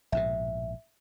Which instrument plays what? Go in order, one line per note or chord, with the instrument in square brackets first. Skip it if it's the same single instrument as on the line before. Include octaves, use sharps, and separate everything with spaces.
[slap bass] A#1 G#2 B2 [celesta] E5